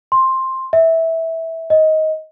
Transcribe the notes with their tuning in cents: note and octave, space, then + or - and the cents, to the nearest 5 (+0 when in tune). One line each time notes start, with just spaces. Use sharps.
C6 +10
E5 -15
D#5 +15